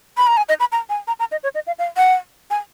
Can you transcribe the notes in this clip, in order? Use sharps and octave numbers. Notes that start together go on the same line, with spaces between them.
B5
A#5
G#5
D#5
B5
A#5
G#5
A#5
A#5
D#5
C#5
D#5
F5
F5
F#5
G#5